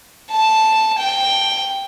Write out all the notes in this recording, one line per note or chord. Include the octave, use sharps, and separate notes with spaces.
A5
G5